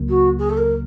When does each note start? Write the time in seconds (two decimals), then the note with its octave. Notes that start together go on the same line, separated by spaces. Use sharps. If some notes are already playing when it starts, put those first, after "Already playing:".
Already playing: C#2 C#3 F#3 A#3
0.09 F#4
0.39 G#4
0.50 A4
0.58 A#4